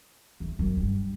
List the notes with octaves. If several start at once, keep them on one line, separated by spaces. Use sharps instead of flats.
E2
F#2
G2